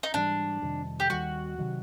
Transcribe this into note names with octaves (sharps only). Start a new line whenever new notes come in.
D#4
G#2 E3 G3 D4
F2 C3 D#3 G3
G4
D#2 D#3 G3 F#4
C3 D#3 F#3